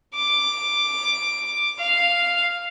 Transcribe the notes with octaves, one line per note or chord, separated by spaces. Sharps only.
D6
F5